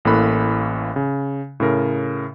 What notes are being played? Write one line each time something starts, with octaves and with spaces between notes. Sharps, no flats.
A1 A2 A#3 A4 B5 F#6
C#3
A2 C#3 A#4